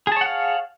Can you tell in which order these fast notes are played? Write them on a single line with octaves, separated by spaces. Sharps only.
G#4 A5 C#5 F#5 F5